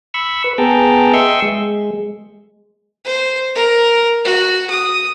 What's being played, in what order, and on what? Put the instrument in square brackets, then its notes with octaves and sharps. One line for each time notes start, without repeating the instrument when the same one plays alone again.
[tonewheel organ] B5 C#6 E6
B4
B3 G#4 G5 A5 A#5
D#5 E5 G5 C6 C#6 E6
G#3
[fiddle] C5
A#4
F#4
D#6